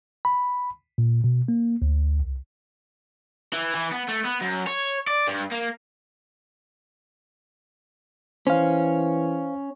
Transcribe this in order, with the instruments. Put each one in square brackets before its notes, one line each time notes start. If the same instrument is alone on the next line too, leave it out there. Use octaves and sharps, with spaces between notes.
[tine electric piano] B5
A#2
B2
A#3
D2
C2
[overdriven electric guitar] E3
E3
B3
A3
B3
F#2
C#5
D5
G2
A#3
[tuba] E3 [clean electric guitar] C#4 [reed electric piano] C5 F5